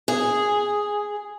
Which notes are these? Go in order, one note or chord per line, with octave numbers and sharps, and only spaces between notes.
G#4